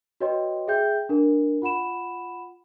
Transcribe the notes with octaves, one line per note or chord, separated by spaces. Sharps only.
F#4 B4 C#5 D#5 G5 C6
G#4 E5 G5 G6
D4 A#4
F4 F#5 B5 E7